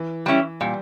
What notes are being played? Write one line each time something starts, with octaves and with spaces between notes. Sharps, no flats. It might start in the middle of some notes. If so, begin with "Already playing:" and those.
Already playing: E3
G3 C#4 E4
A#2 G3